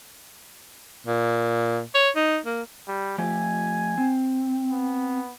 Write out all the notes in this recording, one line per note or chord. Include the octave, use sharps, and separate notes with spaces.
A#2
C#5
D#4
A#3
G3
F3 A3 G4 G#5
C4
B3